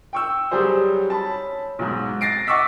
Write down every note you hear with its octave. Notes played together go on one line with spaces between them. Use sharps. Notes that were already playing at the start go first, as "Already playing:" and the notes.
G5 C#6 E6
F#3 G3 C#4 G#4 C5
C#4 A5 B5
B1 G#2
A6 A#6 C7 D7
D#5 F#5 C#6 D6 E6 B6